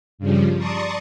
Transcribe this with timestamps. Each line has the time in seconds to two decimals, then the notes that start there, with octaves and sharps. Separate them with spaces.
0.18 G2 C#3 F3 G3
0.57 D5 A5 A#5 C6 C#6 D#6